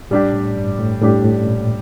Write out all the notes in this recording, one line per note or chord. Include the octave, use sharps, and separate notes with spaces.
A2 G3 D4 G4
A2
G2
A2
A2 G3 D4 G4
A2
A#2